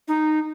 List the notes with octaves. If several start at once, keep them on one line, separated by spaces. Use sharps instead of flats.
D#4